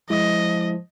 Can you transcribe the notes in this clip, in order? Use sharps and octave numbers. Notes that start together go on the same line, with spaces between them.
F3 G#3 E4 D#5